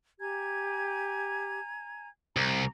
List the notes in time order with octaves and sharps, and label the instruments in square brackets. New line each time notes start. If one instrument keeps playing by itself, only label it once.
[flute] G4 [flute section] G#5 A#5 G#6
[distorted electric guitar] C2 [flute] A#5